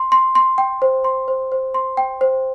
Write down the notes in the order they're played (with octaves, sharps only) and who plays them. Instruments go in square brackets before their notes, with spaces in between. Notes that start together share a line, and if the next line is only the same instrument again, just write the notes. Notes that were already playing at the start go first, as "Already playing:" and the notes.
Already playing: [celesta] C6
C6
C6
G5
C5
C6
C5
C5
C6
G5
C5